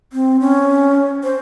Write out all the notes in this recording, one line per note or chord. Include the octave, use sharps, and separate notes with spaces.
C4
C#4
C5